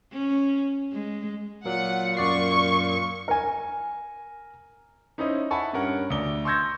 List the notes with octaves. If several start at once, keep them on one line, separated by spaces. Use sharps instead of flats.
C#4
G#3
A#2 F#3 F#5
F#2 D5 C#6 C7
A#4 G#5
C#4 D#4 E4 C5 D#5
E5 F#5 G#5 A5 B5 C#6
G2 C#4 A#4 F#5
D2 D5 G7
C6 C#6 E6 G6 G#6 A#6